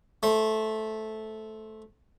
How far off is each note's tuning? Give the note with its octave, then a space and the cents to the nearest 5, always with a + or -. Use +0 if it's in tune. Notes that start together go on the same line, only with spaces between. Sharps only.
A3 -10 C5 +5